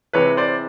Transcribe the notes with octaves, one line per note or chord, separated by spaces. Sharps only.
C3 E3 G#3 B4 C#5
C5 D5